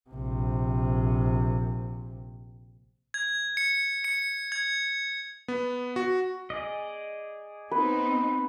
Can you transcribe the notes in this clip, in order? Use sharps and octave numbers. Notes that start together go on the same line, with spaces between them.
A#1 C3
G#6
C#7
C#7
G#6
B3
F#4
G#4 D5 D#5
B3 C4 D#4 B4